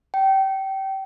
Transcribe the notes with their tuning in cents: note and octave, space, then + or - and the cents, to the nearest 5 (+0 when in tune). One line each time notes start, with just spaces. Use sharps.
G5 -25